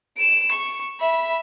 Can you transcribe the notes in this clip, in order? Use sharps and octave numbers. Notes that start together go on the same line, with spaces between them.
D7 E7
C#6
E5 B5